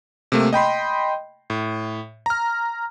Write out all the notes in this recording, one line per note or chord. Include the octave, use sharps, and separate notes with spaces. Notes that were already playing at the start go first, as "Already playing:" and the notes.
C3 A3 A#3
D#5 G5 B5 C6
A2
A#5 F6